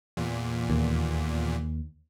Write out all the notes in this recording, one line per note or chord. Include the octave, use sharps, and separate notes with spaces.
E2 A#2
D#2